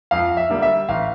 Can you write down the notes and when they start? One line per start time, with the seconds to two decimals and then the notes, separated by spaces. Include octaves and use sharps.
0.11 F2 F5
0.37 E5
0.50 D3 G3 A#3
0.62 E5
0.88 A1 F5